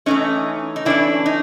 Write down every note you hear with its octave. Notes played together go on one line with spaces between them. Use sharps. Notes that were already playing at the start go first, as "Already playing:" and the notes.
E3 A3 C#4 D#4
D#4
E3 A3 C#4 D4 E4
D#4